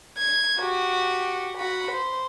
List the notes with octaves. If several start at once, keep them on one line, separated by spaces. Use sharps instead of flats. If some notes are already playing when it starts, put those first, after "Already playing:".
G#6
F#4 G4
F#4 B5
C5